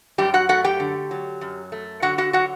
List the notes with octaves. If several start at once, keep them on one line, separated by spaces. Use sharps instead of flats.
F#2 G3 G4
F#4 F#5
A3 F#4 F#5
G4 G5
D3
F#3
F#2
A3
D3 F#4 F#5
F#4 F#5
F#3 F#4 F#5